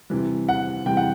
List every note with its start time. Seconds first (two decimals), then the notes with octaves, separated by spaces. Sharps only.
0.10 C3 E3 G3
0.49 F#5
0.86 C3 E3 G3 G5
0.97 F#5